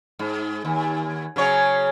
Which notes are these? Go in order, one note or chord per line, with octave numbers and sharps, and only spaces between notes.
G#2
D#2
C#3 F#3 C#5